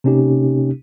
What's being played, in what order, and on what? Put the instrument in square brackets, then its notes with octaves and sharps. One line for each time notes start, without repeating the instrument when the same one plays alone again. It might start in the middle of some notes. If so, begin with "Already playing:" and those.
[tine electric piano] C3 A#3 C#4 D#4 G4